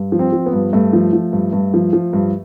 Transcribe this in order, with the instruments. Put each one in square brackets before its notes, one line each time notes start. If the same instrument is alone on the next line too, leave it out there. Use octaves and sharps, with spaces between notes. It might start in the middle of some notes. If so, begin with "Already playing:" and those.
Already playing: [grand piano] G2
F3
C4
F3
B3
G2
G2 A3
F3
F3
G2
G2
F3
F3
G2